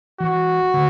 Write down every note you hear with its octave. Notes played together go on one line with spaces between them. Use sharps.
E3 F#4
D3